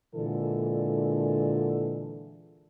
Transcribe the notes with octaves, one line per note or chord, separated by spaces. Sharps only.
A#2 D3 E3 G#3 A4